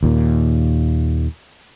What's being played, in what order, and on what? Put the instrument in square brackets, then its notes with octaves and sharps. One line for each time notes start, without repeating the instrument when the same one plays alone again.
[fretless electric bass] D#2 A#2